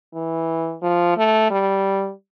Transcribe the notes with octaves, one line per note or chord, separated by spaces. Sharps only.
E3
F3
A3
G3